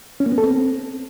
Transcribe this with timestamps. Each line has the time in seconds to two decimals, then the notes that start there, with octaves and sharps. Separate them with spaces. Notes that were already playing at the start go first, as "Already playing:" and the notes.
0.20 C#4
0.26 A#3
0.32 B3
0.38 A4
0.44 C4